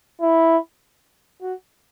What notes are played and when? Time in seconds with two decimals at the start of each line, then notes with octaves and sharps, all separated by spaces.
0.21 E4
1.42 F#4